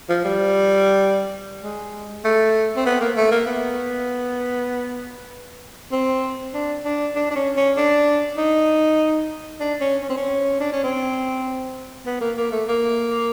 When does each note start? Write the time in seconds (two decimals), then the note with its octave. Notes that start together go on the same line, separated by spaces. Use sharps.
0.09 F3
0.25 G3
1.63 G#3
2.25 A3
2.77 C4
2.86 B3
3.01 A#3
3.16 A3
3.31 A#3
3.46 B3
5.92 C4
6.54 D4
6.85 D4
7.16 D4
7.31 D4
7.35 C#4
7.56 C#4
7.77 D4
8.37 D#4
9.60 D4
9.81 C#4
10.02 C#4
10.09 C4
10.17 C#4
10.60 D4
10.72 C#4
10.83 C4
12.06 B3
12.21 A#3
12.37 A#3
12.52 A3
12.68 A#3